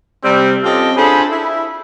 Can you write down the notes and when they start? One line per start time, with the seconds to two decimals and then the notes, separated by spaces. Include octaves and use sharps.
0.23 C3 G3 C4
0.64 C4 C#4 F4 G4 A4 D#5
0.97 D4 F4 G#4 A4 C5 B5
1.30 E4